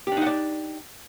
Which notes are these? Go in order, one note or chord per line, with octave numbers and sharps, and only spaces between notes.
D4 D#4 G4 D5 F#5